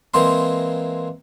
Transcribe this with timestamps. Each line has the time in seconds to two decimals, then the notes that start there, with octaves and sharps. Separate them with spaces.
0.14 E3 G#3 A#3 C4 C6